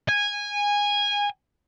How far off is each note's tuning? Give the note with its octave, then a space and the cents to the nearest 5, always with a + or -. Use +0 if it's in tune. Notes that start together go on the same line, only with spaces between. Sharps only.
G#5 -15